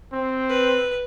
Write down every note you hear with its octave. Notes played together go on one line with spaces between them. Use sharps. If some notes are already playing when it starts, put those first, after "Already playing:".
C4
B4